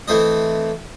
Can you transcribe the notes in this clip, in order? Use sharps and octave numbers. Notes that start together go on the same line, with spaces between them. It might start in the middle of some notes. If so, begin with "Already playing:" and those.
E3 A3 C4 D#5